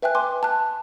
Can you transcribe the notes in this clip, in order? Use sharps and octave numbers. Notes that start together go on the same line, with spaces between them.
B4 E5 G5 G#5 F#6
G#5 C6 D6
A5 F#6